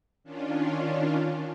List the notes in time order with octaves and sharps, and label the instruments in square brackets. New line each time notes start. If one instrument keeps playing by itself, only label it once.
[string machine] D#3 C#4 D4 F4